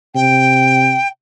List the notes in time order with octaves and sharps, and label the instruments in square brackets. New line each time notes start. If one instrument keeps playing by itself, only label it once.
[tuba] C3 [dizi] G5